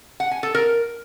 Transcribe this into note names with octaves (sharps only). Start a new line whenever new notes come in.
F#5
G#5
A4
A#4